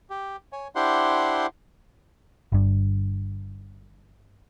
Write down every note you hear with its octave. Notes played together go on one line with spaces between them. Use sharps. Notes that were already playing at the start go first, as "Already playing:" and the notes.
G4
C#5 G#5
D4 E4 G4 C5 F#5 C6
G1 G2